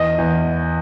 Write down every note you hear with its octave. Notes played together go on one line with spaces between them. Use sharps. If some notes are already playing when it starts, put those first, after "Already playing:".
Already playing: E2 D#5
E2